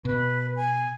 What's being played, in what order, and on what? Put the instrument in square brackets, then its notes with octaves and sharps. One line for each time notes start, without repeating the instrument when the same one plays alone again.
[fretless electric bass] B2 [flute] B4
[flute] G#5